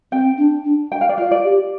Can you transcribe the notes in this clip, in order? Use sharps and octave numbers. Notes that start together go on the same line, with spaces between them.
C4 G5
D4
D4
G5
F5
D5
F4 F5
D5
G4